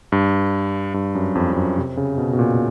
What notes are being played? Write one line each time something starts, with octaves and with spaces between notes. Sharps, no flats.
G2
G2
F#2
F2
F2
F#2
C3
C#3
B2
B2
A#2